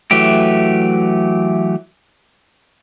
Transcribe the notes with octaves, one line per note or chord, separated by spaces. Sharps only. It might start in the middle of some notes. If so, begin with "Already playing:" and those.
E3 F#3 A3 G4